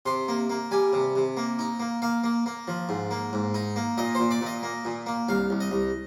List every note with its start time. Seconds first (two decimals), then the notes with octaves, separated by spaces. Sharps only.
0.06 C3 C6
0.28 A#3
0.50 A#3
0.71 G3 G#5
0.93 C3
1.15 C3
1.37 A#3
1.59 D#4
1.80 A#3
2.02 A#3 F5
2.24 A#3
2.46 A#3
2.68 F3
2.89 G#2
3.11 A#3
3.33 G#2
3.54 D#4
3.76 A#3
3.98 A#2 D#5
4.15 A#2 C5
4.31 D5
4.41 A#2
4.46 D#5
4.63 A#3
4.85 A#2
5.06 A#3
5.29 C2 F5
5.50 C2
5.60 D#5
5.71 C2